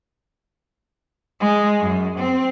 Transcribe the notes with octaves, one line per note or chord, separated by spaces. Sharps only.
G#3
F#2
C4